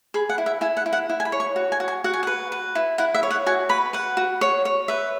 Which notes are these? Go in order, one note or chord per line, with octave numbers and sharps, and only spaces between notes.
G#4 B5
F#5
E4
E5
E4 G#5
F#5
E4
F#5
E4
G#5
B5
C#5
C#6
F#4
G#5
F#4
G#5
F#4 F#5
G#5
B4 F#5
B4
E4
E4 F#5
E5
C#5
F#5
F#4 G#5
B4 B5
B4 F#5
F#4
C#5
C#5
B4 E5